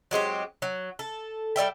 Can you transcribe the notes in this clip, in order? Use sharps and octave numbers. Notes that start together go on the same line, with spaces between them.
F#3 G#3 C4 G4
F#3
A4
G3 D5 E5 G5